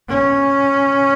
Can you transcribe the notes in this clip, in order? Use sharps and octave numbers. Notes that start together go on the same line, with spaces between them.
C#4